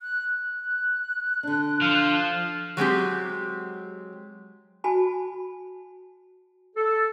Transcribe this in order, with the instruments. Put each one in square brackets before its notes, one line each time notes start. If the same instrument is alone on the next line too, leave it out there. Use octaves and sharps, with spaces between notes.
[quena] F#6
F#6
[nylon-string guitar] D3 D4
[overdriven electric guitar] F3 [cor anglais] F5
[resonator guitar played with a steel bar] F#3 G#3 C4 G4
[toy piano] F#4 G#5 A5 B5
[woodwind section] A4